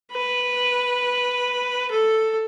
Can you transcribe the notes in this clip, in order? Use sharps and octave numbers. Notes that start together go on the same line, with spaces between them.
B4
A4